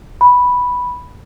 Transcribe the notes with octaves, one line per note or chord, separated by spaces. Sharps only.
B5